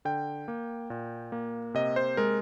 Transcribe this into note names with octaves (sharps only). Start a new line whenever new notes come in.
D3 G5
A#3
A#2
A#3
C3 D#5
C5
G#3 A#4